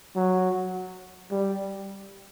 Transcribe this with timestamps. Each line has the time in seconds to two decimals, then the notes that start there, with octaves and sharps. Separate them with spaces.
0.16 F#3
1.31 G3